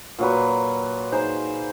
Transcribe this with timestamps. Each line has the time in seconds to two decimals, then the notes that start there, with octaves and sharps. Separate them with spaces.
0.19 A#2 F#3 B4
1.12 D#4 G#4 C5